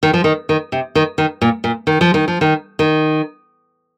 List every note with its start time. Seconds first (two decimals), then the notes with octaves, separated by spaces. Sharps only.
0.03 D#3
0.14 F3
0.24 D#3
0.49 D#3
0.72 C3
0.95 D#3
1.18 D#3
1.41 A#2
1.64 A#2
1.87 D#3
2.01 F3
2.14 D#3
2.28 F3
2.41 D#3
2.79 D#3